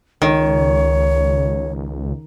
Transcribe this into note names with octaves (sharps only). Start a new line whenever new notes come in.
C#2 D#3 C#5